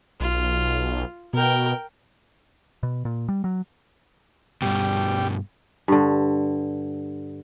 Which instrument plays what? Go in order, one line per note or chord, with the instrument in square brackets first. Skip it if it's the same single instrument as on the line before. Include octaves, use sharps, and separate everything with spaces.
[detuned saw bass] B1 [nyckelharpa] F4
[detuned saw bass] B2 [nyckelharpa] A#4 G5
[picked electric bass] B2
A#2
G3
F#3
[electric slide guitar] G2 B2 [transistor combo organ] G3
[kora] G2 D3